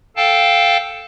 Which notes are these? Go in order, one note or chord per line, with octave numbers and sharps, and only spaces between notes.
A4 F5 G5 A5